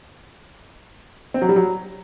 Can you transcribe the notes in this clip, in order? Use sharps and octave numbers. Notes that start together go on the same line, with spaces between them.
C4
F#3
G3
F#3